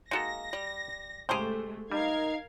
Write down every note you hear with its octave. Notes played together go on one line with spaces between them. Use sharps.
G#3 A#3 D#4 F#4 A4 A#6
G3
A2 C#3 G#3 A3 G4 G#4 C5
G3 D#4 A#4 F5 G#6